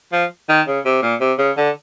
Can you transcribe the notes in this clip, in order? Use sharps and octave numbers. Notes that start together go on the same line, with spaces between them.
F3
D#3
C#3
C3
A#2
C3
C#3
D3